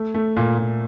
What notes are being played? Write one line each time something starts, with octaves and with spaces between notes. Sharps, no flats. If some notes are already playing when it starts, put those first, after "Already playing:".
Already playing: A3
A3
A#2
A#2